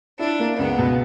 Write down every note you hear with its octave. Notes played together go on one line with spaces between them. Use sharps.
D4 E4
A#3
C#2 B3
B2